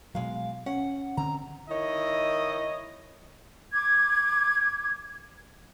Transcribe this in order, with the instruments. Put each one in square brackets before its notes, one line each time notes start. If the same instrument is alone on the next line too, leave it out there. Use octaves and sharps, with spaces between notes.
[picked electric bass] B2 F#3 [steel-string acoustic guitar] G#3 F5
[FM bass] C#4 [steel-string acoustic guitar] F#5
[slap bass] D3 C4 [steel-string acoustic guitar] A#5
[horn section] D#3 E4 C#5 D#5
[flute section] D6 G#6